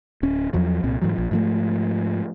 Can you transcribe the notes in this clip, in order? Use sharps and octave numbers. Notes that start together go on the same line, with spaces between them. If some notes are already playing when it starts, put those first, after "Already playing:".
D1 C#4
E2 F3 F#3
C2 A#2 C4
G#2 C3 E3 F#3
A#1 F3
G#2 F3 A3